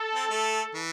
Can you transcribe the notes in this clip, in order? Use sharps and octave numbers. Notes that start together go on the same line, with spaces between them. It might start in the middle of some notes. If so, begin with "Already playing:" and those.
Already playing: A4
C4
A3
E3